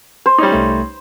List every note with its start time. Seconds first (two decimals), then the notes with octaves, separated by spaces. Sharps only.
0.26 C5
0.38 G3 C#4 D#4
0.52 C2 A3